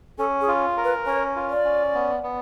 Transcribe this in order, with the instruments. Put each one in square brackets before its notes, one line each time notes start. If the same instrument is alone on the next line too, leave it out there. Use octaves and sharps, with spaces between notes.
[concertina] C#4 [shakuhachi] A4
[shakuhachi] G#4
[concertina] F4
A#4
[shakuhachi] B4
[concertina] C#4 [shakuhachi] C#5
[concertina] F4
[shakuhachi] D5
[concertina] C#4
B3
B3